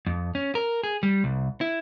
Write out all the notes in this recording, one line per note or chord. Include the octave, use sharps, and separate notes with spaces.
F2
C#4
A#4
G#4
G3
C2
E4